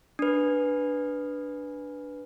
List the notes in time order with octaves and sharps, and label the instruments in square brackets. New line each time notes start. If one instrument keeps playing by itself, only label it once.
[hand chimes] D4 B4